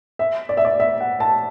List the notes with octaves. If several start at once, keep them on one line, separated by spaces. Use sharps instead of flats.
E5
D5
E5
D5
E5
F#5
A5